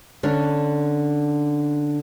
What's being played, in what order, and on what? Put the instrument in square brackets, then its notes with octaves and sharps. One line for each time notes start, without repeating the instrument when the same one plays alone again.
[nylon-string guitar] D3 C#4 D4